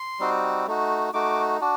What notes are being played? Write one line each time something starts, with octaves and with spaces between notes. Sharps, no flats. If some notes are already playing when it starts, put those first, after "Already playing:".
Already playing: C6
G3 C4 D#4 F#4
A3 D#4 F#4
A3 D#4 F#4 D6
D4 F#4